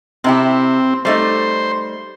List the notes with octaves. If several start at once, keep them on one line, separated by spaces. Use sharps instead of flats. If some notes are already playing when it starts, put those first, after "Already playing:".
C3 C4 E4 G4
G3 A3 D#4 C5